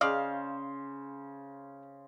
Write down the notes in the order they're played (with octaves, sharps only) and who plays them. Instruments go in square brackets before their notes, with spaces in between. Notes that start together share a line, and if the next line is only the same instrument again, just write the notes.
[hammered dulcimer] C#3 C5 [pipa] D5 D#5 F5